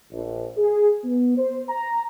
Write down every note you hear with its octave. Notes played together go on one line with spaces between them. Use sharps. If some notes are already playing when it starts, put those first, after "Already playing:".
A#1
G#4
B3
C5
A#5